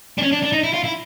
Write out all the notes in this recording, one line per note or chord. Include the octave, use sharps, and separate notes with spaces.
D4
C#4
D4
D4
D#4
E4
F4
E4